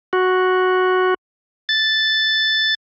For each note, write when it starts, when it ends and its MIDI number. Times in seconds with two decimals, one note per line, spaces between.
0.13 1.14 66
1.69 2.74 93